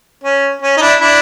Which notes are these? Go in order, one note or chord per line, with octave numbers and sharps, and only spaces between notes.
C#4
C#4
D#4
D4 E4
D4 E4